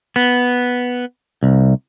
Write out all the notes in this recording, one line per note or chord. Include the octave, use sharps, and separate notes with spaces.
B3
C2